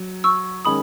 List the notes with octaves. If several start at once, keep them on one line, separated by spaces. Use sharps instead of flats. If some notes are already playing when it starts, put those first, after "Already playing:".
Already playing: F#3
C#6 E6
D#3 G#3 C#4 B5 D#6